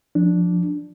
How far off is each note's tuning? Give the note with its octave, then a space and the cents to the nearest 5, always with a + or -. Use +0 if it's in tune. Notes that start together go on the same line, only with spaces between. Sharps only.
F3 +10 D4 +0